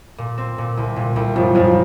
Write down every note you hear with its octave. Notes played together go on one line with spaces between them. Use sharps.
A#2
C4
A#2
C2
A#2
C2
F#1 F3
F#1 F3